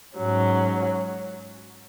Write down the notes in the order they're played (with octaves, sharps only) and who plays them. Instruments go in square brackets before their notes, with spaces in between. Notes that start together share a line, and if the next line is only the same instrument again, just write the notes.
[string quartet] G#2 F#3 C#4